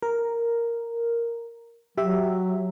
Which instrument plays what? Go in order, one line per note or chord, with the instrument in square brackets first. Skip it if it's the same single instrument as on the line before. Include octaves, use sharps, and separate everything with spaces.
[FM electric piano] A#4
[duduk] F#3 [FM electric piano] G4 E5